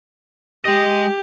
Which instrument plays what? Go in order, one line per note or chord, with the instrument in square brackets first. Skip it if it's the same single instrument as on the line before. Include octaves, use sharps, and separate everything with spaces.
[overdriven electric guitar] G#3 D#5 [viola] G4